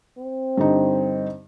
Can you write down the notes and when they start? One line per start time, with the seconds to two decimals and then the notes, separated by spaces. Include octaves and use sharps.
0.18 C4
0.57 G2 D3 D#4